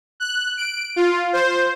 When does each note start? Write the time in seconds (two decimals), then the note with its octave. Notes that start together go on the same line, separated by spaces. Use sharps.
0.20 F#6
0.57 D7
0.96 F4
1.33 C5